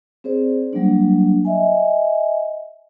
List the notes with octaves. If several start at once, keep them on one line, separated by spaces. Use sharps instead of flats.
C4 G#4 C5 D5
F#3 G3 A#3 D4
D#5 E5 G#5